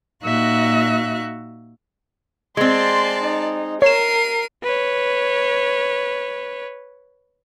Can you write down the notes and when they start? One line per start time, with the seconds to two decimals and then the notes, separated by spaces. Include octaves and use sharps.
0.24 A#2 D#4 F#4 E5 F5 F#6
2.57 G#3 C4 D5 A5 C6
3.23 D#4
3.82 A#4 C#5 C7 D#7 E7
4.63 B4 C#5